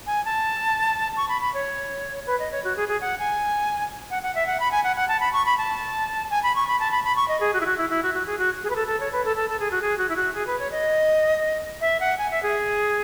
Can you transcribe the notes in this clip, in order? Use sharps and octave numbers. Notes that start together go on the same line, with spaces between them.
G#5
A5
C#6
B5
B5
C#5
B4
D#5
C#5
F#4
G#4
G#4
F#5
G#5
F#5
F#5
E5
F#5
B5
G#5
F#5
F#5
A5
B5
C#6
B5
A5
G#5
B5
C#6
B5
A5
B5
B5
C#6
D#5
G#4
F#4
E4
F#4
E4
E4
F#4
F#4
G#4
F#4
G#4
B4
A4
A4
C#5
B4
A4
A4
A4
G#4
F#4
G#4
F#4
E4
F#4
G#4
B4
C#5
D#5
E5
F#5
G#5
E5
G#4